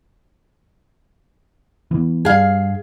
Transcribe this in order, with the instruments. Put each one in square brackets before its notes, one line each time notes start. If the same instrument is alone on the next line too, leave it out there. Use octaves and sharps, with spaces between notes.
[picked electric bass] E3 B3
[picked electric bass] G2 [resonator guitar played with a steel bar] G#4 F5